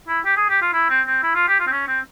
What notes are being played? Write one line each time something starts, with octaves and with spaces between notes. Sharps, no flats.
E4
G4
G#4
G4
F4
E4
C4
C4
E4
F4
G4
F4
C4
C#4
C4